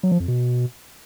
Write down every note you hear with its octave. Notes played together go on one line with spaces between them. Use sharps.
F#3
F3
F2
B2